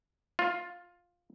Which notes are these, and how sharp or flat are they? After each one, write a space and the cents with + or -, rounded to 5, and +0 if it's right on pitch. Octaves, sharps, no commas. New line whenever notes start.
F4 +10